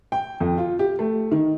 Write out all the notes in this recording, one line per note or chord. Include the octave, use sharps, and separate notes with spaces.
G5
F2
F4
G4
A3
D#3